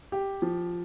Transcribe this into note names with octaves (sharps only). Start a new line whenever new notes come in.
G4
F3